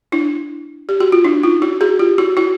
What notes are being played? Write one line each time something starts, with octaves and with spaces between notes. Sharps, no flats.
D4 E4
G4
F#4
F4
D4 E4
D#4 F4
E4 F#4
F#4 G#4
F4 G4
E4 F#4
E4 F#4